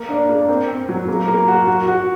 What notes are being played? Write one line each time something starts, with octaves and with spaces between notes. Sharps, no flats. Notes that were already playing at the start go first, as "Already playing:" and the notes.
Already playing: A#3
D4
A#3
C4
C4
F#3
A#3
A#3
F#4
F#4
F#4